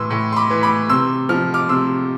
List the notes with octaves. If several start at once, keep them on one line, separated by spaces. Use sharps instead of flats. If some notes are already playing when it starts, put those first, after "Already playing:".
Already playing: A2 E3 C6 D6 E6
A2
C6
B5 D6
E3
B5 D6
C3 C6 E6
F3 F6
D6 F6
C3 C6 E6